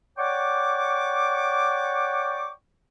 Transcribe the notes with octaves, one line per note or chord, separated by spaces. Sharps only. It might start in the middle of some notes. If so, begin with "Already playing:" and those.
C#5 D5 F#5 G5 C#6 D6